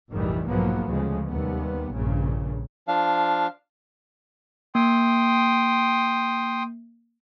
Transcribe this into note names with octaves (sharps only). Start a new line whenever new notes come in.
F1 A#1 G#2 D#3 E3 G3
B1 G#2 F3 F#3 A#3 B3
D2 C#3 F3 G#3
D#2 C3 G3 B3
A#1 G2 A#2 C#3
F3 D4 F5
A#3 G5 C6 D#6